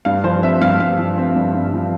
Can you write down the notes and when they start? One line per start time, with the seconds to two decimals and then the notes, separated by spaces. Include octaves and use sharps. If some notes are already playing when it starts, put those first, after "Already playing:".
0.05 G2 F5
0.24 F3 C5
0.43 C4 E5
0.61 G2 F5
0.80 G2 F5
0.98 F3
1.17 C4
1.36 G2
1.54 G2
1.73 F3